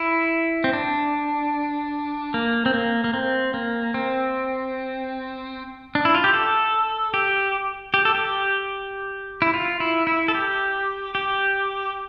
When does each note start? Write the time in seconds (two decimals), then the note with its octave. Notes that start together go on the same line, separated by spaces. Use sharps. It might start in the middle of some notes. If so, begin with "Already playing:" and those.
Already playing: E4
0.64 C4
0.73 D4
2.34 A#3
2.66 C4
2.74 A#3
3.04 A#3
3.14 C4
3.54 A#3
3.94 C4
5.95 D4
6.05 E4
6.15 F4
6.24 G4
6.34 A4
7.14 G4
7.94 G4
8.05 A4
8.15 G4
9.42 E4
9.54 F4
9.80 E4
10.07 E4
10.28 A4
10.35 G4
11.15 G4